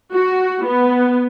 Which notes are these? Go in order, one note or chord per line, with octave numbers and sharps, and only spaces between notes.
F#4
B3